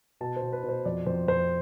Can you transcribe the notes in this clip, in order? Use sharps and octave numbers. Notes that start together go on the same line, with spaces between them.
B2 A5
C5
B2
B4
B2
C5
F2 D5
F2 C5
F2 C5